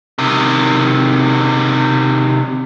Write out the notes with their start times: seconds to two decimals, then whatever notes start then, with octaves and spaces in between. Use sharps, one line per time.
0.18 C3 D#3